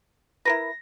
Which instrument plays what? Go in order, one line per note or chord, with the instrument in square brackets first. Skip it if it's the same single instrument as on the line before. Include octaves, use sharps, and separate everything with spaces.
[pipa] E4 A#4 B4 [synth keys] A#6